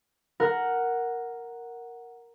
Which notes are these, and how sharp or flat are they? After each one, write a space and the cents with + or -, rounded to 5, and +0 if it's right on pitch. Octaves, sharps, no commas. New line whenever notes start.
A#4 +0 F#5 +0